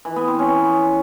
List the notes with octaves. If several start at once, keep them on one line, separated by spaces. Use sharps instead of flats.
E3
B3
C4
C#4